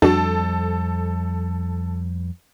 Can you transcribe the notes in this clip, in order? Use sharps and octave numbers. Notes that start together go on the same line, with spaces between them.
F2 G3 D4 F#4 A4